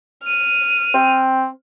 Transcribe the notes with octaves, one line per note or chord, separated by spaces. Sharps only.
F6 D#7
C4